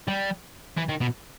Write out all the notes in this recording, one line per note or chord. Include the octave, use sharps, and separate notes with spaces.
G3
E3
D#3
B2